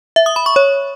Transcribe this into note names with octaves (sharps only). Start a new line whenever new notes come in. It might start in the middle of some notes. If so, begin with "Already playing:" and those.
E5
D#6
B5
C#6
C#5